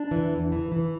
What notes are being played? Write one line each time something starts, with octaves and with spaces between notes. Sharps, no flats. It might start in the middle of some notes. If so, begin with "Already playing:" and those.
Already playing: D4
E3
E2
E3
E3